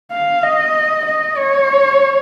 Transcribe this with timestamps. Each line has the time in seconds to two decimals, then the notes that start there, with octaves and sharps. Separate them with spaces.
0.12 F5
0.43 D#5
1.06 D#5
1.37 C#5